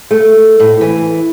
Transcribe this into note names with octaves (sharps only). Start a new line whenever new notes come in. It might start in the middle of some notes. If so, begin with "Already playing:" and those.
A3
A2
E3